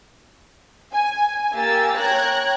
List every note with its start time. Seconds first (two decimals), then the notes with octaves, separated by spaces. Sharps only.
0.92 G#5
1.54 A#3 G4 A#4 G#5 E6 A6
1.97 C#5 G5 A#5 F#6 G#6 A#6